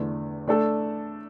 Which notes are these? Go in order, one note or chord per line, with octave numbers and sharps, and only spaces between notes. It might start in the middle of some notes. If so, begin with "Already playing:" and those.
Already playing: E2 D3 A3
A3 D4 A4